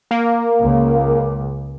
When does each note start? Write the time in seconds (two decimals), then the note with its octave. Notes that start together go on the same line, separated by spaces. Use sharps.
0.11 A#3
0.61 C#2